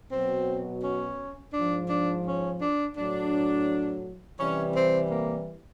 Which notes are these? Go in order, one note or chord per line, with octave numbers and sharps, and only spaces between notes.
B2 F#3 C4
C#4
G#2 F3 D4
D4
C#4
D4
A2 F#3 D4
C3 E3 G3 C#4
C4
A#3